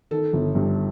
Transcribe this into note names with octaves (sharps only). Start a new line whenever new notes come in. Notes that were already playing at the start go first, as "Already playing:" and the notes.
D#3 A4
G1
G2